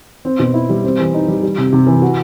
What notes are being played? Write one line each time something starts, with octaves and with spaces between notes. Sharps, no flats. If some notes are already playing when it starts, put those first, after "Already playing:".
C4
B2
E4
G3
C4
E3
D#4
G3
G3
C3
C3
E3
F#4